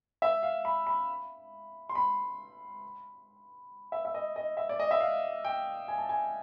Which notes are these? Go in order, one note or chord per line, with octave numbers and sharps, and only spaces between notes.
E5
F5
B5
B5
C6
B5
E5
E5
D#5
D#5
E5
D5
D#5
E5
F5
G5
G#5
A5
G#5